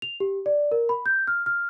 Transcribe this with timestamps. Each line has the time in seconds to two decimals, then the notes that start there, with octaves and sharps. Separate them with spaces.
0.02 F7
0.20 G4
0.46 D5
0.72 A#4
0.89 B5
1.06 G6
1.27 F6
1.46 F6